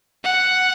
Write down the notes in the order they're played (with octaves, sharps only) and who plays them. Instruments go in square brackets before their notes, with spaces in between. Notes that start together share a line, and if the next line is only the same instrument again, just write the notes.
[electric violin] F#5